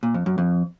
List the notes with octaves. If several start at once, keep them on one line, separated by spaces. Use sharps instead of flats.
A#2
F2
F#2
F2